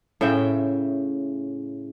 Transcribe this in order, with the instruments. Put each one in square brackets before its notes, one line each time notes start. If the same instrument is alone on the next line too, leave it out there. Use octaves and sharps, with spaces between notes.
[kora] A2 C#3 E5 G5